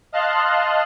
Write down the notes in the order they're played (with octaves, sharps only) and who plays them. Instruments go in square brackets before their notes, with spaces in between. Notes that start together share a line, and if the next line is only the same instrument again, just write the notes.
[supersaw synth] D#5 F5 A5 C6 F#6